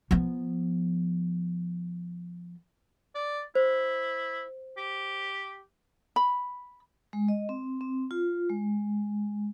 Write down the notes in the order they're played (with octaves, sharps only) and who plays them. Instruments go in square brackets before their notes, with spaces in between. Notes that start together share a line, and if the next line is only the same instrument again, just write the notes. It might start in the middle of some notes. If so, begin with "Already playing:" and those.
[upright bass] F3 B3
[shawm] D5
[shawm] E4 [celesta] C5
[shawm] G4
[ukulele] B5
[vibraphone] G#3
D#5
C4
C4
F4
G#3